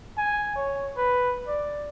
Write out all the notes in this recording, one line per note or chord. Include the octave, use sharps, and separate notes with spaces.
G#5
C#5
B4
D5